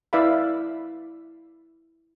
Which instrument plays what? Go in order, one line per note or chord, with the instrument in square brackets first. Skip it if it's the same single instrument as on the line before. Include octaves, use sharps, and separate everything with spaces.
[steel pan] E4 B4 D5 E5 F5 B5